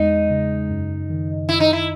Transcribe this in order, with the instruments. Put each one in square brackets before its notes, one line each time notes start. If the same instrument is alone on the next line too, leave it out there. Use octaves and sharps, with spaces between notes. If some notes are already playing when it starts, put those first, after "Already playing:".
Already playing: [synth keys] E2 G#3 [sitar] D#4
[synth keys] C#3
F#2
D#3
[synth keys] F#2 [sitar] E4
[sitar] D#4
E4